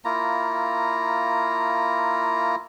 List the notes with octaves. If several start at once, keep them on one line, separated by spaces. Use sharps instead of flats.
A#3 E4 F4 A#5